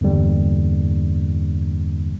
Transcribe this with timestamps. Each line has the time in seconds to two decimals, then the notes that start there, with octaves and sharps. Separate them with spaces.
0.01 E2 G2 D3 G3 A#3